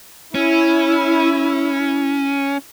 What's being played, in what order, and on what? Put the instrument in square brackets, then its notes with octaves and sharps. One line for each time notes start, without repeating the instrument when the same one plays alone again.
[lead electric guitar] C#4 [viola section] E4